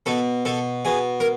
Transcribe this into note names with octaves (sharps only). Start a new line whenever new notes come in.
B2 A4
B2 A4
B2 G#4
A#4